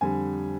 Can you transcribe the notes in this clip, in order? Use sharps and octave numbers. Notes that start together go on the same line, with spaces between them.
F2 D3 G3 G#5